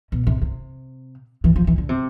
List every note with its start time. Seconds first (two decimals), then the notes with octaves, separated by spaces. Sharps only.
0.12 B2
0.27 C3
0.42 C3
1.44 E3
1.56 F3
1.67 E3
1.78 D3
1.89 C3